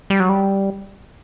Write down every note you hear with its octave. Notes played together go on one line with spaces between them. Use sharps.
G3
F#3
G3